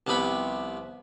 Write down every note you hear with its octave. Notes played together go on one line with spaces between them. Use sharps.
C2 C3 F3 B3 B5 C#6